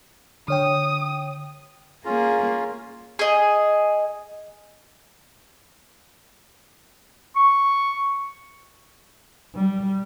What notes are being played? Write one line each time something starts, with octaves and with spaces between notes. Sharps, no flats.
D3 C#5 G5 D#6
A#3 C#4 F4 G#4
G#4 D#5
C#6
G3